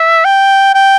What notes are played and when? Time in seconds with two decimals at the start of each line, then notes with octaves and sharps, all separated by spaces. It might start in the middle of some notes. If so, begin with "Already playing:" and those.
Already playing: E5
0.25 G5
0.75 G5